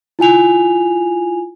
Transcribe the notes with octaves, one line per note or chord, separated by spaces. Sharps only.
E4 F4 G#5 F7